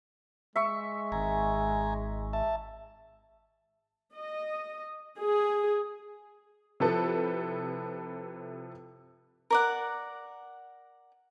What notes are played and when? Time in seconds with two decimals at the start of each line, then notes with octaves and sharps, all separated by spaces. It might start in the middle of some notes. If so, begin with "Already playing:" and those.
0.56 G#3 E5 C#6
1.12 G#1 G#5 A#5
2.33 E5 A5
4.13 D#5
5.19 G#4
6.80 C3 F3 E4 A4 B4
9.51 A#4 D5 F#5